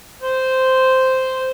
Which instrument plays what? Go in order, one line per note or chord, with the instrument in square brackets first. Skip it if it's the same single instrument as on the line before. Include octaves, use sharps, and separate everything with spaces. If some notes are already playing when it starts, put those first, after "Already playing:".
[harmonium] C5